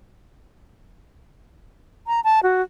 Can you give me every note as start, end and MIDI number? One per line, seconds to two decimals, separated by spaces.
2.07 2.20 82
2.24 2.43 81
2.43 2.62 66